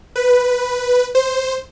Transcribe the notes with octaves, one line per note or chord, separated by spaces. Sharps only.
B4
C5